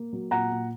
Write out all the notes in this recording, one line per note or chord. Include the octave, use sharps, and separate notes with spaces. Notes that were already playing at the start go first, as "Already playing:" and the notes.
Already playing: A#3
F#3
A#2 F#5 A#5
A#2